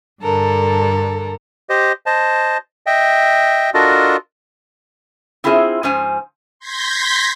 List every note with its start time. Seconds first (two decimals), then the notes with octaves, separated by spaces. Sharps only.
0.22 G2 D3 A4 A#4
1.69 G4 C5 D#5
2.06 C5 D#5 A5
2.86 D#5 E5 G5
3.74 D4 F4 F#4 A4 A#4 D#5
5.44 C4 E4 F4 G#4 A#4 C5
5.83 G#2 F3 C#4 C5 G#5
6.59 C6 G6 G#6 A#6 B6